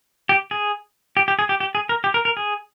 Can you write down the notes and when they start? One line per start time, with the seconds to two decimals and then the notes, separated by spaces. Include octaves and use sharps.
0.29 G4
0.51 G#4
1.17 G4
1.28 G4
1.39 G#4
1.49 G4
1.60 G4
1.75 G#4
1.89 A#4
2.04 G4
2.14 A#4
2.25 A#4
2.37 G#4